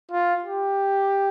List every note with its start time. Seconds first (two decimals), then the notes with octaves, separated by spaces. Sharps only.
0.11 F4
0.44 G4